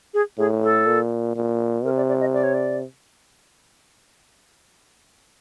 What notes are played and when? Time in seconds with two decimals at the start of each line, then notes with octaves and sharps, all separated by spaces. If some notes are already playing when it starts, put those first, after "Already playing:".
0.14 G#4
0.38 A2 G#4
0.63 A4
0.86 A#2
1.36 A#2
1.84 C3 A#4
1.97 D5
2.08 D5
2.21 D#5
2.34 D5
2.43 C#5
2.54 D5